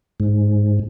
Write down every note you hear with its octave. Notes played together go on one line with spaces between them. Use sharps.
G#2